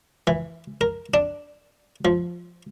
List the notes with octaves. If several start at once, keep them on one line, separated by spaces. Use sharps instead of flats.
E3
A#4
D4
F3